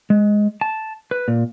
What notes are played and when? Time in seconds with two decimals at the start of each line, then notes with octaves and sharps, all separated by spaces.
0.10 G#3
0.61 A5
1.11 B4
1.28 A#2